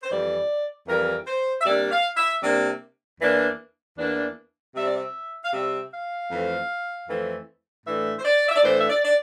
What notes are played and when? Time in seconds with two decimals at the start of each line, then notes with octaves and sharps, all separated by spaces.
0.03 C5
0.10 F2 E3 G3 D5
0.88 F2 E3 G3 A#4
1.27 C5
1.61 E5
1.66 C3 G3 A#3 D4 D5
1.92 F5
2.17 E5
2.43 C3 G3 A#3 D4
3.21 E2 E3 A#3 D4
3.98 E2 E3 A#3 D4
4.76 C3 G3 C4 E5
4.86 D5
4.95 E5
5.45 F5
5.53 C3 G3 C4 E5
5.93 F5
6.31 F2 E3 A3 C4
7.09 F2 E3 A3 C4
7.86 A2 E3 A3 D4 E5
8.19 C5
8.25 D5
8.49 E5
8.56 D5
8.64 A2 E3 A3 D4 C5
8.79 E5
8.90 D5
9.05 D5